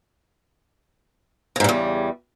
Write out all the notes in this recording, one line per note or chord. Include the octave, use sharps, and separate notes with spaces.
E2 G#2 C#3 G3